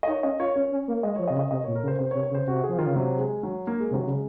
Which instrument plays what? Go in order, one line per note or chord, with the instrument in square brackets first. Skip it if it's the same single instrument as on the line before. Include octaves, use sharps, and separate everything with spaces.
[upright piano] D#5
[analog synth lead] D#4 [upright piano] C#5
[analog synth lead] C#4 [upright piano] D#5
[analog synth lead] F4 [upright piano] C#5
[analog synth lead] C#4 [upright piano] C#5
[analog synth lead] C#4
A#3
[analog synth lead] G#3 [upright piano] D#5
[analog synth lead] F3 [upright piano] C#5
[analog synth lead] C3 [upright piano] D#5
[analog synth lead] C#3
[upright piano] D#5
[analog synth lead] C3 [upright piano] D#5
[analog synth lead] A#2 [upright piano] C#5
[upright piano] A#4
[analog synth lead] C#3
[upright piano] C5
[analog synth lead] C3 [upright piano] C5
[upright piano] C#5
[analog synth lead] C3
[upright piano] C#5
[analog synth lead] C#3
[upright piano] C5
[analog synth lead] C3 [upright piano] F#4
[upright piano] G#4
[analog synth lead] F3
[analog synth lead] D#3 [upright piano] F4
[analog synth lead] C#3
[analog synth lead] C3 [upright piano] F#3
[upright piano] G#3
F#3
A#3
G#3
[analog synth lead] C3
[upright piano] F#3
[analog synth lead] C#3 [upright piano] G#3